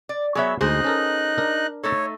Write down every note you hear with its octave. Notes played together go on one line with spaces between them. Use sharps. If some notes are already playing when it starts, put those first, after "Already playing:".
D5
F#3 B3 G#4 C#5 E5
D2 G#3 D#4 G#4 C5 D#5 F#6
C#4 A4 A#4
D4 A#4
A3 D#4 A4 C#5